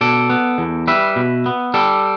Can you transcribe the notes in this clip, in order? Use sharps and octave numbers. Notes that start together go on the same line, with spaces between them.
B2 A4 D5
B3
E2
G3 B4 E5
B2
B3
G3 A4 D5